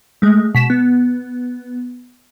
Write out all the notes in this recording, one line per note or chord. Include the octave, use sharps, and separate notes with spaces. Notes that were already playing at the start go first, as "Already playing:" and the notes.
G#3 A3
B2 B6 E7
B3